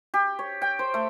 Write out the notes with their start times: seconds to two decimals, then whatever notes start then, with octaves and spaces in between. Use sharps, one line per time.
0.14 G4
0.39 C#5
0.62 G5
0.79 C5
0.94 A3